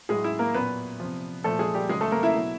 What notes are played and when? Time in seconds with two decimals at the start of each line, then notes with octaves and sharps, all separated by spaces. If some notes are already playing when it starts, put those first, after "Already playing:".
0.09 A2 F#3 G#3 G#4
0.24 E4
0.39 A#3 A#4
0.55 A#2 F#3 B3 B4
1.00 C3 F3
1.44 A#2 F3 A3 A4
1.59 G#3 G#4
1.74 G3 G4
1.89 C#3 F#3 G#3 G#4
2.01 A3 A4
2.12 A#3 A#4
2.23 E4 E5
2.34 B2 F#3